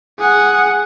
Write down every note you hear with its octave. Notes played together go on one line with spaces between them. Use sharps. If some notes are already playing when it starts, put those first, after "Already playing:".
G#4 F#5